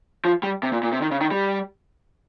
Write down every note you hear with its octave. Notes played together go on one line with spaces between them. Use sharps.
F3
G3
C3
A#2
A#2
C3
D#3
C#3
D#3
G3